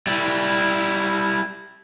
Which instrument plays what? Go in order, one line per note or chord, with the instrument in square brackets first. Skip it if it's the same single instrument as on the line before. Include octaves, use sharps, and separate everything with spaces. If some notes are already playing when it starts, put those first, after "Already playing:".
[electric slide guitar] G3 E4